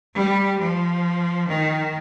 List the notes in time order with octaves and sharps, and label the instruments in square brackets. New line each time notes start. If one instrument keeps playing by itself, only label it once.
[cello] G3
F3
D#3